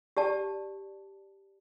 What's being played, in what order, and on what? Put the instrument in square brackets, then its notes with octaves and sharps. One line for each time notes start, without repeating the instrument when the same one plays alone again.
[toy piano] G4 D5 A5